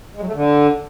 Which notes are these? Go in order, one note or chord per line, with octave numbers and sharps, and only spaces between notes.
G#3
F#3
A3
D3